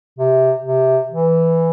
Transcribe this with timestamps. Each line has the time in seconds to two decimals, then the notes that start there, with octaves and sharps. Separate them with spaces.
0.19 C3
0.65 C3
1.11 E3